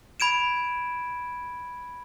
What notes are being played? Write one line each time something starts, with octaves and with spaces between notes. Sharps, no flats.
B5 G#6 D7 E7